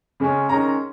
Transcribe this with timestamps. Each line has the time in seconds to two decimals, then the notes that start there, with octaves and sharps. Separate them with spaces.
0.20 C#3 G#3 C#4
0.49 D#3 G#3 C#4 A#5